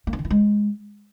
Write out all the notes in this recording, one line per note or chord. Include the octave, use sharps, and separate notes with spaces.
A#3
D4
D#3
E4
G#3